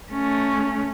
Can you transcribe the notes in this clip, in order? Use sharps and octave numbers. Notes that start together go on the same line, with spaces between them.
A3 C#4